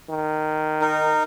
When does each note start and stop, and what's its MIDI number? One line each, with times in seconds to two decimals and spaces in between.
0.10 1.11 51
0.81 1.23 63
0.81 1.23 70